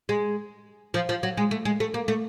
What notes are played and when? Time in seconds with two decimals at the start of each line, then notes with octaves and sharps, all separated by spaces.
0.09 G#3
0.94 F3
1.09 F3
1.23 F#3
1.37 G#3
1.51 A3
1.65 G#3
1.80 A3
1.94 A#3
2.08 A3